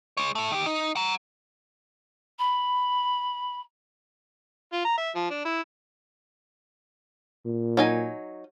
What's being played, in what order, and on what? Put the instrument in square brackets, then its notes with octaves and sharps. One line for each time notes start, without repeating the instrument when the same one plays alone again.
[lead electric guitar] G#3 C#5
A2 A3
D#3 G4
D#4
F#5 A#5
[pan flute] B5
[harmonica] F4
A#5
E5
F3
D4
E4
[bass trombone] A#2
[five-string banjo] F#3 D#4 G#5